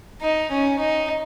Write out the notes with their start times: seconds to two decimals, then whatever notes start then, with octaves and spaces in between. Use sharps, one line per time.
0.21 D#4
0.51 C#4
0.79 D#4